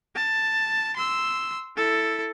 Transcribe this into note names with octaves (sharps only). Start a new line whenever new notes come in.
A5
C6 E6
E4 A4